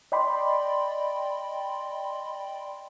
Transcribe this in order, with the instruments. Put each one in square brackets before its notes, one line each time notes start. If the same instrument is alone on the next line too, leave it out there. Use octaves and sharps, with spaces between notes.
[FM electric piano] D5 D#5 G5 B5 C6